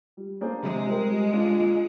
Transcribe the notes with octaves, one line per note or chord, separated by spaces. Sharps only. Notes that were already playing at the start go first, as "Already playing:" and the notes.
G3
A#3 D4 G#4 C5
C3 G#3
G3 C4 G4 A#4
G3
D4 F4
A#2